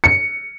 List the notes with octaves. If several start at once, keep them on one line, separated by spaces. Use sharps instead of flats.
C#7